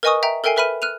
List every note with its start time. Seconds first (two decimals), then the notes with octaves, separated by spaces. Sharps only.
0.03 A#4 B4 D#5 G#5 C#6 D#6
0.23 E5 G5 A#5
0.44 A4 A#4 E5 G5 G#5 C7
0.56 A#4 B4 E5 B5 F6 D#7
0.82 F6 F#6 D#7 F7